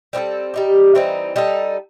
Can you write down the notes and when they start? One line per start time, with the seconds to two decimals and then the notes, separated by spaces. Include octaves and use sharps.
0.13 G3 C4 D#4 A4
0.54 G3 D#4 G4
0.95 E3 G3 C4 D#4
1.36 G3 D#4 A4